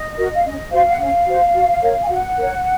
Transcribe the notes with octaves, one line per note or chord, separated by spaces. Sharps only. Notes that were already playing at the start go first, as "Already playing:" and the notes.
Already playing: D#5
F#4 A#4
F5
C#4 D#5
F#4 C5 F5
F#5
C#4 F5
F#4 C5
F#4
A#4 C#5
G#5
F#4 F#5
A#4 C#5